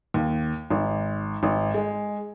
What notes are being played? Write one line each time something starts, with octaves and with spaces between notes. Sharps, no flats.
D#2
G#1
G#1
G#3